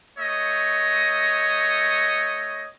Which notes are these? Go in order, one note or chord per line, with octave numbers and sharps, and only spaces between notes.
A3 C#5 D#5